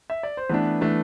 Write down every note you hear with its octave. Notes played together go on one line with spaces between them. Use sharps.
E5
D5
C5
E3 A3 B3 D4 B4
E3 A3 D4